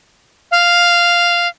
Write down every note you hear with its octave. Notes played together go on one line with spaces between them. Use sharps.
F5